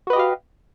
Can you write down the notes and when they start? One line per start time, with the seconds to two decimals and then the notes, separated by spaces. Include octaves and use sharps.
0.07 F#4
0.10 B4
0.13 D#5
0.16 G4
0.19 F5